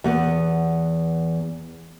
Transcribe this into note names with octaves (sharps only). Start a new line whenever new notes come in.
E2 B3